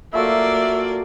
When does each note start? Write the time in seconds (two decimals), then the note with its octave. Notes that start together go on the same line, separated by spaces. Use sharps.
0.14 F#3 A3 A#3 F4 D5 E5